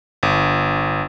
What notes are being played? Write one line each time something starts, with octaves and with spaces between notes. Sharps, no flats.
G1